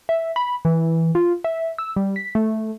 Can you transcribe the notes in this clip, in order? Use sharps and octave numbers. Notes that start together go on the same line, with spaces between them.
E5
B5
E3
F4
E5
E6
G3
B6
A3